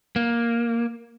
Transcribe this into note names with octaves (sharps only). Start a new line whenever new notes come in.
A#3